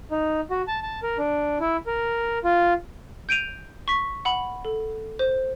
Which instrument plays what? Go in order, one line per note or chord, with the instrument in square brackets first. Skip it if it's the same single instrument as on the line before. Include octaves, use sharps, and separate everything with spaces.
[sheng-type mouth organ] D#4
F#4
A5
A5
A#4
D4
E4
A#4
F4
[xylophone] G6 D7 D#7 F7
C#6 B6
F#5 B5
A4
C5